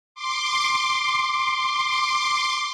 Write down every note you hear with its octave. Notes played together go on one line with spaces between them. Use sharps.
C6 D6